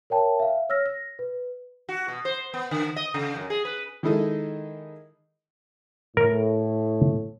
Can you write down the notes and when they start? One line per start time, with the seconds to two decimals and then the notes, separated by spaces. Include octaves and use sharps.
0.10 A#4 C#5 E5 G5 A5
0.40 E5 F5
0.69 C#5 E6 F6 A#6
0.86 A#6
1.19 B4
1.89 F#4
2.08 B2
2.25 C5
2.54 B3
2.71 D3
2.96 D#5
3.14 C#3
3.36 F#2
3.50 G#4
3.65 B4
4.03 D#3 G#3 D#4 E4 A4 D#5
6.17 A2 A#4